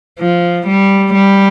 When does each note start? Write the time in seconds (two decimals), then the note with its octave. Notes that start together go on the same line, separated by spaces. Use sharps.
0.19 F3
0.67 G3
1.15 G3